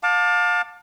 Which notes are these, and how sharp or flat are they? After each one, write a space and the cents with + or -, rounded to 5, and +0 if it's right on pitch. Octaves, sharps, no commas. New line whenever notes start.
F5 +35 A5 +15 D6 +10